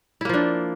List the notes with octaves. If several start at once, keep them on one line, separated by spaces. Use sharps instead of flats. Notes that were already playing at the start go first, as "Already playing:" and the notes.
F3 A#3 D4 E4